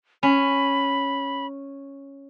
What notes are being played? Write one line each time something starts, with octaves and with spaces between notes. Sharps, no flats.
C#4 B5